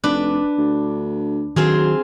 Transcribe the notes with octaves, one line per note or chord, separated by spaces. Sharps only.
F1 D4 B4
D2
D#3 F#3 C4 F4 G#4